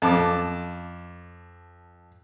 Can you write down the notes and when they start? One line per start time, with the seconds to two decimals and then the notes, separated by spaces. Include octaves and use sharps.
0.02 F2 A5 D6